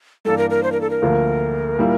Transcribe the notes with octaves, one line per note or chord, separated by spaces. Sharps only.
G2 E3 A#3 D4 A4
A#4
A#4
C5
A#4
A4
A#4
D2 D3 F3 A#3
A#2 G3 A#3 E4